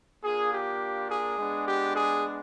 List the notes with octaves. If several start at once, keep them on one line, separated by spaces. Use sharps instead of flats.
A#3 D4 F4 G#4
G4
G#4
G#3 B3 D4
G4
G#4